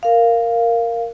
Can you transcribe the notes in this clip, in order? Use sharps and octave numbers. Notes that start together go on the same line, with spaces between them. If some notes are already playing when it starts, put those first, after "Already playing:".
A#4 F5